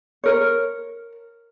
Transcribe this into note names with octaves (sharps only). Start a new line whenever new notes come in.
A#4 C#5